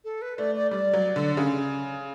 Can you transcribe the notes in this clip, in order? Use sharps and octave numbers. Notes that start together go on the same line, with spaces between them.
A4
B4
A3 D5
D5
G3 D5
F#3
D3
C#3